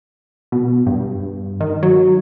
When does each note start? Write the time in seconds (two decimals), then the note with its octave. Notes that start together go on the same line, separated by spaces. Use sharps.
0.52 B2
0.86 G2
1.60 D#3
1.83 F#3